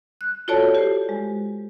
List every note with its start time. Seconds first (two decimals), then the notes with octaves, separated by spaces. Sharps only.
0.21 F#6
0.48 F4 F#4 A4 C#5 D5 A5
0.75 G4 C5
1.09 G#3